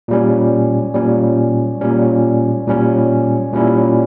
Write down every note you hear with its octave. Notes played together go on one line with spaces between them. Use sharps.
A#2 G3 C#4
A#2 G3 C#4
A#2 G3 C#4
A#2 G3 C#4
A#2 G3 C#4 E4